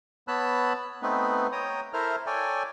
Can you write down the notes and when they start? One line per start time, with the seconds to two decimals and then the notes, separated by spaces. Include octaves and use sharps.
0.28 B3 C#5 A5 B5 E6 F#6
1.02 A3 B3 C4 D#4 B4
1.52 C#5 G5 A#5 D#6
1.93 E4 A4 A#4 C5 E5 F6
2.27 A4 C#5 D5 G5 G#5